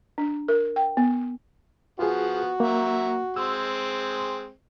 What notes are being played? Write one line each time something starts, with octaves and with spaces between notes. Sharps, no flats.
D4
A#4
G5
B3
F3 B3 F4 F#4 G#4
F#3 A#3 E5 A#5
G#3 C4 E6